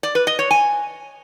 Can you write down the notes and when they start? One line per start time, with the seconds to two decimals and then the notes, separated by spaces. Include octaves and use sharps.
0.03 D5
0.15 B4
0.27 D#5
0.39 C#5
0.51 G#5